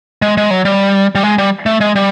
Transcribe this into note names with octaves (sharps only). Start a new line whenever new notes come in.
G#3
G#3
F#3
G3
G3
G#3
G3
A3
G#3
G3